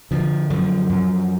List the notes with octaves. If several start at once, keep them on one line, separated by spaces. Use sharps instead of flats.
D3 F3
F#2 F3
F#2